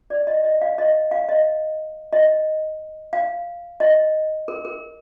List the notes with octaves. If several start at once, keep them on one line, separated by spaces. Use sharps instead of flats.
D5
D#5
D#5
F5
D#5
F5
D#5
D#5
F5
D#5
A#4
A#4